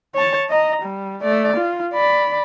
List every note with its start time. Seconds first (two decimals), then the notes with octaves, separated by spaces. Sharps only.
0.14 C#5 A5
0.50 D#5 A#5
0.83 G3
1.23 A3 D5
1.57 F4
1.94 D5 B5